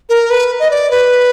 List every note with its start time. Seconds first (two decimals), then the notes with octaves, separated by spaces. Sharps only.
0.09 A#4
0.30 B4
0.59 D#5
0.71 D5
0.91 B4